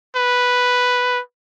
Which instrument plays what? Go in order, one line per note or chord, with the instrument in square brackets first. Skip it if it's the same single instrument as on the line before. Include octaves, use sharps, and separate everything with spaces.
[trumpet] B4